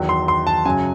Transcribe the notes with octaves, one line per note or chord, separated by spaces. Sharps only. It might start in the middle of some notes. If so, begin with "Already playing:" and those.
Already playing: E2 D#3 F#3
C6
C6
A5
F#2 C#3 F#3 G#5